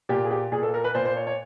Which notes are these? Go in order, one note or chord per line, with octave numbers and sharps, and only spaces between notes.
A#2 G4
G#4
G4
A#2 G#4
A4
A#4
B4
A#2 C5
C5
C#5
C#5